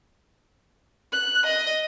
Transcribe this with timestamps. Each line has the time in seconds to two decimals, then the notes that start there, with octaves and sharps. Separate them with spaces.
1.13 F#6
1.46 D#5